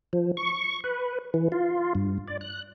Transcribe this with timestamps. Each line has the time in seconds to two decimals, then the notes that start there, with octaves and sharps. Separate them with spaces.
0.13 F3
0.37 C#6
0.84 B4
1.34 E3
1.52 F4
1.95 G2
2.28 D5
2.41 F#6